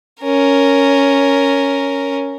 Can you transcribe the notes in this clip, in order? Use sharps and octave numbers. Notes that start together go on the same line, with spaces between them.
C#4 A#4